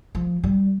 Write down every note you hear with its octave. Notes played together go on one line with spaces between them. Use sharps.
F3
G3